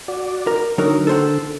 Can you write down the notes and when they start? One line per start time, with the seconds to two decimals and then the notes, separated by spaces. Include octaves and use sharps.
0.08 F#4 D5
0.47 A#4
0.78 D3 F#3 D#4 A#4
1.07 A4 C5 F#5